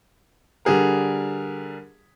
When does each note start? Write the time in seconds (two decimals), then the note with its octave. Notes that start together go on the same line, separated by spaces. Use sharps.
0.65 D3 G3 G#4 A#4